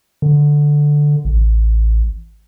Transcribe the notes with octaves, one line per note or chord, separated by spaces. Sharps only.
D3
A1